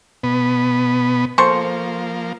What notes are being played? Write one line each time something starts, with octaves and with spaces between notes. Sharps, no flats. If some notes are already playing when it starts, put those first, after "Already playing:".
B2 B3
F3 A#3 A4 C5 C#6